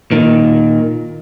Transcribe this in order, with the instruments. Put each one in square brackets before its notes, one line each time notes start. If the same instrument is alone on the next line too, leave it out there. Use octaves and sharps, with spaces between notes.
[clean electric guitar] A#2 D#3